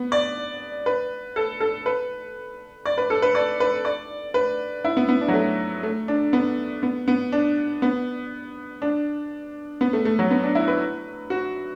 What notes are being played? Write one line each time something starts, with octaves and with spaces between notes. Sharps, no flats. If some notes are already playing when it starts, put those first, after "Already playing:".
Already playing: B3
D5
B4
A4
A4
B4
D5
B4
A4
B4
D5
B4
D5
B4
E4
B3
B3
D4
F#3
A3
A3
D4
B3
B3
B3
D4
B3
D4
B3
A3
A3
F#3
B3
D4
E4
B4
F#4